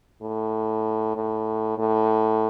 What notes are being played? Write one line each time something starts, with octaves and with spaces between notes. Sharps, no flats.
A2
A2
A2